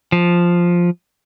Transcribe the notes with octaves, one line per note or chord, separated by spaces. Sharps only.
F3